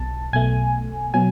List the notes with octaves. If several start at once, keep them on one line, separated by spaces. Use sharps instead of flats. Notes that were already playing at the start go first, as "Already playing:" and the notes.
Already playing: B1 B2 A5
B1 B2 A3 G#5
B2 F#3 G#5